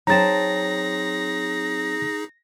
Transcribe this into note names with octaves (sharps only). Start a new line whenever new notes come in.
F#3 C4 D#4 G#4 A5 A#5 A6 A#6